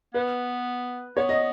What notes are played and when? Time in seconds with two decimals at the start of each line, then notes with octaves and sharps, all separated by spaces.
0.14 B3 B4
1.17 B3 C#5
1.29 D#5